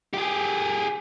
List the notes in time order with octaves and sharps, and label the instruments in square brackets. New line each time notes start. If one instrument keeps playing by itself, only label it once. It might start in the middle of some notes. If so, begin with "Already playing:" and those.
[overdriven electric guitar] G4 G#4